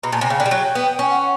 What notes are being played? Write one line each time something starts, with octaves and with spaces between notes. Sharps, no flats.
B2 A#5
A#2 A5
C3 G#5
C#3 G5
D3
G3
F#3
B3
C#4
F#5